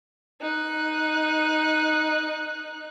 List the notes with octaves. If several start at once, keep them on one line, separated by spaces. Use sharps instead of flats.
D#4 F#6